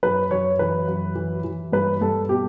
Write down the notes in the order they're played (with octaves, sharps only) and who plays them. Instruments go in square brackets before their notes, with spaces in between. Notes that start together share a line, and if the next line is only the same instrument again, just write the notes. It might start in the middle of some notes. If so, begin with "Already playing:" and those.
[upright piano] F#2 B4
F#2 C#5
E3 B4
F#2
E3
E3
G2 B4
G2 A4
B2 G4